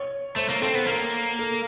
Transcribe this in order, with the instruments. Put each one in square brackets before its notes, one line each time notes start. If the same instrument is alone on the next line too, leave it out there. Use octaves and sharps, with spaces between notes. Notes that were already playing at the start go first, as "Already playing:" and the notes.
Already playing: [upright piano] C#5
[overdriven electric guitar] A3 [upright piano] C5
[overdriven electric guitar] A#3
[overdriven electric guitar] C4 [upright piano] A4
[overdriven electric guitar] B3
[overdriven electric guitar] A#3 [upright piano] A#4
[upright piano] A4